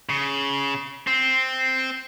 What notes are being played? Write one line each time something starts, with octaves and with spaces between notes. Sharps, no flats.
C#3
C4